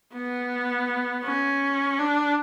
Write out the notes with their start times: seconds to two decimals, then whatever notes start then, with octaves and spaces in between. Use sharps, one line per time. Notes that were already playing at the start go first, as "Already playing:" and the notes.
0.14 B3
1.25 C#4
1.99 D4